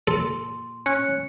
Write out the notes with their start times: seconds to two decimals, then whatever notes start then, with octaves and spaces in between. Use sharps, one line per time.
0.07 A#2 A4 C6
0.86 C#4 F#6 C#7